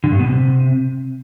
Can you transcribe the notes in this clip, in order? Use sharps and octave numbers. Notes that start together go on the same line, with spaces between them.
D3
G2
B2
C3